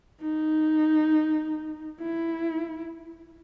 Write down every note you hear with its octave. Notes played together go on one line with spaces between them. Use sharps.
D#4
E4